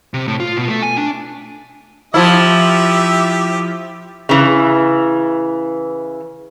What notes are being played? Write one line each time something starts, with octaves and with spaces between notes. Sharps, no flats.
C3
A2
F4
B2
A3
G#5
D4
F3 E4 G4 E5
C#3 E3